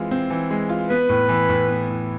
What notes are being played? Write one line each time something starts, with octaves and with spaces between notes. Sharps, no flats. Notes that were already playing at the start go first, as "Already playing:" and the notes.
Already playing: E3 G#3 C4 F4
C4
E3
G#3
F4
B3 B4
A2
E3
A2
B3
A2